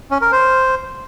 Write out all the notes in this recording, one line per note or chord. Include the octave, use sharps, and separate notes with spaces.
C#4
A#4
C5